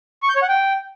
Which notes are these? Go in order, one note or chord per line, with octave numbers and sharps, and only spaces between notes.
C#6
G6
C#5
F#5
G5